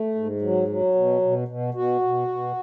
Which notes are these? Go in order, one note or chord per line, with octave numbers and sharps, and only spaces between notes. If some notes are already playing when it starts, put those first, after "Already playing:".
Already playing: A3
G#2
F#3
F#3
B2
B2
B2
B2 F#4
B2
B2